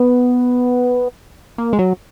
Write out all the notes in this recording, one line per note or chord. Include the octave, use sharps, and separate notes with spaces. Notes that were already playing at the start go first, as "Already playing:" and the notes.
Already playing: B3
A#3
G#3
F#3